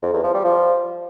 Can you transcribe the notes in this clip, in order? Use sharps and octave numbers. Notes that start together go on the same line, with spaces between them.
F2
E2
F3
G3
F3